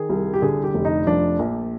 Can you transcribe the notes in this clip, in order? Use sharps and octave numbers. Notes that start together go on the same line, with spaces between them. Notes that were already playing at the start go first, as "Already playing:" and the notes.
Already playing: D#3 G#4
C2
G4
D3 G#4
G4
F1
D#4
F3 D4
A#1